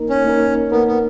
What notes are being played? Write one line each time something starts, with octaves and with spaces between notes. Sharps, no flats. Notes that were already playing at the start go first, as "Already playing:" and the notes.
Already playing: A#3 D#4 A#4
C#4
A#3 D#4 A#4
A#3 B3 D#4 A#4
B3